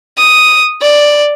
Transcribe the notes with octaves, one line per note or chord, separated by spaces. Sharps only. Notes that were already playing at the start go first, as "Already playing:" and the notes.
D#6
D5